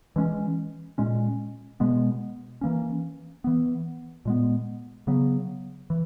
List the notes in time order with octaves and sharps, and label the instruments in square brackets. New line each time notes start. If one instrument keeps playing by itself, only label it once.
[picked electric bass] E3 G#3 C#4
A#2 G#3 C#4
B2 G#3 B3
E3 A#3 C#4
E3 B3
A#2 G#3 B3
C#3 F#3 B3
E3